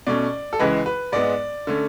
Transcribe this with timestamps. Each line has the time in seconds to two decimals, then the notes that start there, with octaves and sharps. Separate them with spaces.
0.07 B2 A3 C#4 D5
0.53 A4
0.59 C#2 C#3 E3 G#3 B4
0.86 B4
1.12 G#2 G#3 B3 D5
1.67 D3 A3 C#4